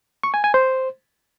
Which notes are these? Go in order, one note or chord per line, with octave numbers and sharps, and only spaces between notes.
C#6
G#5
G#5
C5